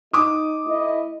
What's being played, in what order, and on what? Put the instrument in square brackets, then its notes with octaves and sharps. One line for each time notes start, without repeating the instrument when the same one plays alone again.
[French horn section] D#4 [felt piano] D6 D#6
[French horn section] A3 E4 D#5